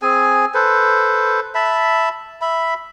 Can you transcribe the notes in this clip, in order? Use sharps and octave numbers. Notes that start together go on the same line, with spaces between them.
C4 G#4 G#5
A4 B4 C5
E5 A5 B5
E5 B5